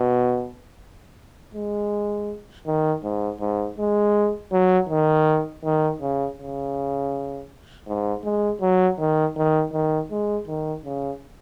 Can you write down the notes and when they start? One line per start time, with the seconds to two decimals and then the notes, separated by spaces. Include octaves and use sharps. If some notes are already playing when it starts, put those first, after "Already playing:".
Already playing: B2
1.55 G#3
2.67 D#3
3.03 G#2
3.40 G#2
3.78 G#3
4.52 F#3
4.89 D#3
5.64 D#3
6.01 C#3
6.39 C#3
7.87 G#2
8.24 G#3
8.61 F#3
8.99 D#3
9.36 D#3
9.73 D#3
10.11 G#3
10.47 D#3
10.85 C#3